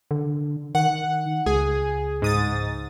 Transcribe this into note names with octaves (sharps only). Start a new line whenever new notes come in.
D3
D#3 F#5
C#2 G#4
G#2 D#6 A6